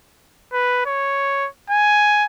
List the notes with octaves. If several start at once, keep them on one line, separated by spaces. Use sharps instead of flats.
B4
C#5
G#5